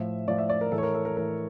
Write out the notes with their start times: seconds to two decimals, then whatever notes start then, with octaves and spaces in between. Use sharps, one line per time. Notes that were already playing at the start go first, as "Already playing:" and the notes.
Already playing: A2 F3 E5
0.28 A2 F3 D5
0.38 E5
0.49 D5
0.61 A#4
0.72 A2 E3 A4
0.78 C#5
0.83 A#4
0.94 A4
1.05 A#4
1.17 A2 E3 A#4